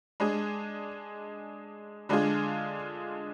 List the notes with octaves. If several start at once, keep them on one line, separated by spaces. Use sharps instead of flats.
G#3 D4 G#4
D3 G#3 D4 F4 G#4